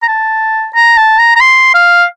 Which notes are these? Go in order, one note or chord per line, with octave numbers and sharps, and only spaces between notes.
A#5
A5
A#5
A5
A#5
A#5
C6
F5